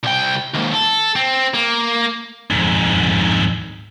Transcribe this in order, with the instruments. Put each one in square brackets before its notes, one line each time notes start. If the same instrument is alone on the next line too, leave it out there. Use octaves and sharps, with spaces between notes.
[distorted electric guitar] C2 G5
D#2 G#2
A4
C4
A#3
F2 G#2